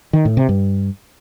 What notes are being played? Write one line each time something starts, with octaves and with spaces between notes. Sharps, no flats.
D#3
A2
C3
G2